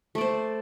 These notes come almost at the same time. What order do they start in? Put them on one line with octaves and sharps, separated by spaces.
A3 D5 C5